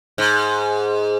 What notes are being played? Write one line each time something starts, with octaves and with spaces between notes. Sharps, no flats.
G#2